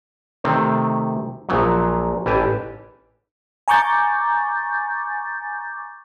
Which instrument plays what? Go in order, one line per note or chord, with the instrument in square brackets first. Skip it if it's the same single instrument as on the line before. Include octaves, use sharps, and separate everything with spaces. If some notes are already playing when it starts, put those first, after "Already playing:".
[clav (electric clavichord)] C3 D#3 A3 C4
A#1 A#2 F3 F#3
A1 E3 G4 G#5 A5
[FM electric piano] G#5 A#5 C#6 D6 G6 A6